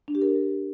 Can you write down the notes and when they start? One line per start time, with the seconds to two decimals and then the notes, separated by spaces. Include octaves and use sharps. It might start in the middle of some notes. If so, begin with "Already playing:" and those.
0.08 D4
0.15 G4
0.22 A#4